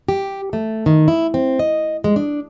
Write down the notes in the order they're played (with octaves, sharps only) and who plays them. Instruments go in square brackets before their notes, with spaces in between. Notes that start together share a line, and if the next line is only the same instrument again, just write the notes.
[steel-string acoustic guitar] G4
A3
D#3
E4
C4
D#5
G#3
D4